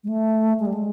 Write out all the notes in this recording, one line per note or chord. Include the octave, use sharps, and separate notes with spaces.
G#3
A3
G#3
G3
G#3